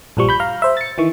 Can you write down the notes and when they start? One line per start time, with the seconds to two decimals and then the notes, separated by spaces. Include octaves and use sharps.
0.17 A#1 G2 F3 G3 C#6
0.29 B5 G6
0.40 F5 A#5
0.62 C5 E5
0.77 A6 C#7
0.98 D#3 E3 C#6